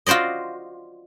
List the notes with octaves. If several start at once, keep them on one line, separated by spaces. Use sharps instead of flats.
F4 F#4 C5 D5 D#5